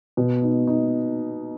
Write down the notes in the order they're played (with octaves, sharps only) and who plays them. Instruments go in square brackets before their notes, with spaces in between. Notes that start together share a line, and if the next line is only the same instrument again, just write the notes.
[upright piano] B2
D#4
D#4